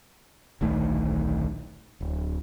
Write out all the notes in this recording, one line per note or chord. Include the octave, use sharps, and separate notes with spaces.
D1 A#1 D#3 A3
D1